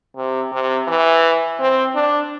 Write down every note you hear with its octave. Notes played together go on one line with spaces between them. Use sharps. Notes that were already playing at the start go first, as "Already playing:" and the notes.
C3
C3
E3
C4
D4